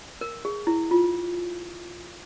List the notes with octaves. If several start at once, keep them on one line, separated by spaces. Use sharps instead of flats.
A#4
G#4
E4
F4